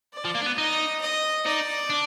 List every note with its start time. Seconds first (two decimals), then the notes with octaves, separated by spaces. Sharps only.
0.13 D5
0.25 F3
0.35 A#3
0.42 D4
0.46 B3
0.58 D#4 D#5
1.01 D#5
1.45 D#4 D5
1.90 D4